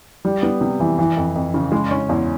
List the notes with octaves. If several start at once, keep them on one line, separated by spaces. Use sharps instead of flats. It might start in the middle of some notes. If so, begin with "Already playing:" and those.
G3
B3
C3
E3
E3
F2
F2
C#3
G#3
C#4
E2